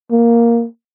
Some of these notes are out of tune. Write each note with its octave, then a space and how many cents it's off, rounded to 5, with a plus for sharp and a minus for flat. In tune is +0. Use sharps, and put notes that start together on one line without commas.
A#3 +5